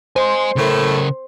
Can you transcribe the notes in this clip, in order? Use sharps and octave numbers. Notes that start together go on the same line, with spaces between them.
C5 D#5 G#5
A2 C#3 A3 A#4